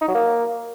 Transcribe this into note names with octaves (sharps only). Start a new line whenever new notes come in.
D#4
F#3
A#3